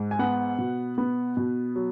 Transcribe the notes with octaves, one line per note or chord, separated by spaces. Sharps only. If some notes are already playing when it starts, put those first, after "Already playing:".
Already playing: G#2
G#5
B3 F#5
B2
B3
B2
F#3